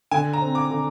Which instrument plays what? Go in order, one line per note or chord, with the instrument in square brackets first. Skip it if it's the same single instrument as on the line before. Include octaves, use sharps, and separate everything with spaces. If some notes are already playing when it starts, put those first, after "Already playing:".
[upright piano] D3 [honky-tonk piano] G#5
[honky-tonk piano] A#5
[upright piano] C4
[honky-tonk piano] D6
[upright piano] D3